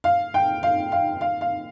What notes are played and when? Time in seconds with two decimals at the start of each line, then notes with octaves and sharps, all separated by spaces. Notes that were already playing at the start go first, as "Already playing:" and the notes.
0.04 F5
0.34 G5
0.63 F5
0.92 F5
1.21 F5
1.41 F5